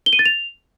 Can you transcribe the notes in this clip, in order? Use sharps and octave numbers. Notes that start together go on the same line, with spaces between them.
G7
D#7
A6
F7